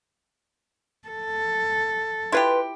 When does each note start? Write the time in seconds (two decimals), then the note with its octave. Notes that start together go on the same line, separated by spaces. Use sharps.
1.09 A4
2.32 E4 F4 G4 B4 C6